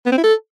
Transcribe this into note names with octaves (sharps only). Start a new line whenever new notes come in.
B3
C4
E4
A4